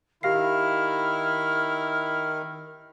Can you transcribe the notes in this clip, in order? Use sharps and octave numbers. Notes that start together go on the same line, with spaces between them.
D#3 E4 G4 F5 F6 C7